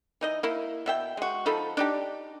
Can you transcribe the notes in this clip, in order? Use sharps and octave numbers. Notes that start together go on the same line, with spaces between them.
E3 D#4 D#5
A#3 E4
B2 E5 G5
G#3 F#4
F3 D#4 A4 B5
D4 D#4 G4